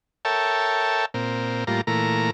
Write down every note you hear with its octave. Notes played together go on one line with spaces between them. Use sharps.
A4 A#4 C#5 E5 G5 A5
A#2 C4 A#4
A2 G3 A#3 F4 A#5
A#2 E3 A3 A#4 A#5